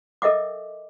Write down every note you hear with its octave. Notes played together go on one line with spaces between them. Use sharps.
A4 A#4 D#5 E5 G5 D6